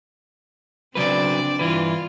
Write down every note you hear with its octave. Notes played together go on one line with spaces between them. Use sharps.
C#3 F#3 C4 D4 B4 D5
G2 E3 F4 B4